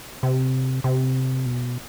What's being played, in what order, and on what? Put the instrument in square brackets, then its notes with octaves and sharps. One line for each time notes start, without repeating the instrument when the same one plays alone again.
[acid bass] C3
C3
B2